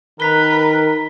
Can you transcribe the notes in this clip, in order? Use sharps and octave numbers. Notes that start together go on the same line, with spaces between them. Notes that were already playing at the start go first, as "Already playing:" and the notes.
D#3 A#4 B4 A#5 B6 G7